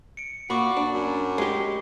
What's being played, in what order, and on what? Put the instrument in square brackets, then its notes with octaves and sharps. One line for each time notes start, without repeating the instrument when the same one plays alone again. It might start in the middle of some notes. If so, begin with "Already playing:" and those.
[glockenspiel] C#7 D7
[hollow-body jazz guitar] A#2 [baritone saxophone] F#4 [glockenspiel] B5 C#6 D6
[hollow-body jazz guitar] D4
[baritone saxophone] F#2
[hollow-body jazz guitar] G#3 G4